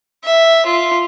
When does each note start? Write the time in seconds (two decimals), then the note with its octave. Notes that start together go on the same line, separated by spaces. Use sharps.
0.24 E5
0.66 F4